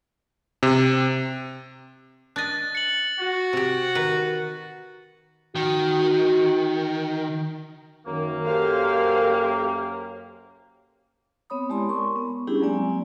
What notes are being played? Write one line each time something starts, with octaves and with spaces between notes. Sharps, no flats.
C3
D4 D#5 F#6 A6
C#7 F#7
F#4
C3 G4
D#3 B4
D#3 F#4
F#2 D#3 A#3
G4 A4 C5 F5
B3 C4 C#5 B5 D#6
G#3 E4 G4 D5 A5 C6
A#4 C6 C#6
B3
G3 C#4 D4 E4 G4 G#4
F#3 G#3 A#3 C4 D5 G#5